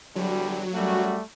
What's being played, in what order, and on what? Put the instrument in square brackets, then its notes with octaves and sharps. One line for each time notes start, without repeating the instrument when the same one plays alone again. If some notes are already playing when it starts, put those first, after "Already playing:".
[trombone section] E2 D3 G3 [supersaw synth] F#3
[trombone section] F#2 F#4 [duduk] G3 [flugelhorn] A3